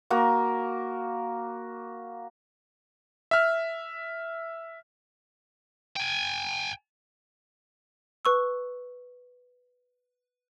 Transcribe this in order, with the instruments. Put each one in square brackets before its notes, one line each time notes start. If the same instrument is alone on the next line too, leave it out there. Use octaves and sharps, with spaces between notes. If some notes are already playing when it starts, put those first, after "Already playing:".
[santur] A#3 F#4 A#4
[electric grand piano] E5 F6
[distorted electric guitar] G5 G#5
[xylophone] B4 C#6 E6